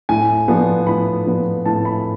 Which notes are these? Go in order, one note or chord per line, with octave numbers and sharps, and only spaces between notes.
A2 G#5
F3 B3 D4
A2 B5
F3 B3 D4
A2 A5
B5